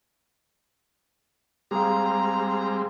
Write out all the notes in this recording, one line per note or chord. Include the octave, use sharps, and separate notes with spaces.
G3 G#3 C4 G4 G#4 F5 A#5